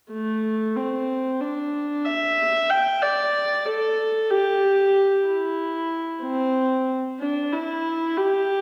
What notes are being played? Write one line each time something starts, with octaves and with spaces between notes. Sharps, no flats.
A3
C4
D4
E5
G5
D5
A4
G4
E4
C4
D4
E4
G4